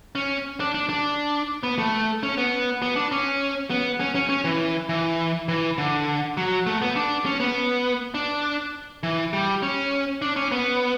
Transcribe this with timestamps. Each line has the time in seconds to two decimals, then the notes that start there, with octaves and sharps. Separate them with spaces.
0.15 C#4
0.60 D4
0.74 D4
0.89 D4
1.63 B3
1.78 A3
2.23 C#4
2.37 B3
2.82 B3
2.96 D4
3.12 C#4
3.70 B3
4.00 C#4
4.15 C#4
4.29 C#4
4.44 E3
4.89 E3
5.48 E3
5.78 D3
6.37 F#3
6.67 A3
6.82 B3
6.96 D4
7.26 C#4
7.40 B3
8.14 D4
9.03 E3
9.33 G3
9.62 C#4
10.22 D4
10.36 C#4
10.52 B3